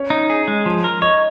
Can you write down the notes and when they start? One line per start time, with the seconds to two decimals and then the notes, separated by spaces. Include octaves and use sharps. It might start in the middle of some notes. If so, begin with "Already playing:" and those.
Already playing: C#4 C#5
0.10 D#4
0.30 G#4
0.48 G#3
0.66 F3
0.84 A#4
1.02 C#5 D#5